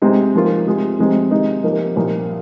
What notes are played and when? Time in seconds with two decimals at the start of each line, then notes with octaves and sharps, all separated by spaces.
0.02 C3 G#3 C4 D#4
0.34 G#2 F3 A#3 F4
0.67 C3 G#3 F4
0.99 F2 C3 G#3 C4 D#4
1.31 C3 D#3 G#3 D#4
1.64 C3 F3 A#3 D#4
1.95 C2 A#2 F3 A#3 D#4